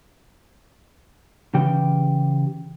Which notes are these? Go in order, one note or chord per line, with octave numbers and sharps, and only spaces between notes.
C#3 E3 G4 G5